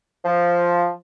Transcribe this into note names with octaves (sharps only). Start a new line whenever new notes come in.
F3